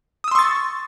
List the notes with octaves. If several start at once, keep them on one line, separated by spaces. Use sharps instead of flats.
C6 C#6 D#6 E6 A6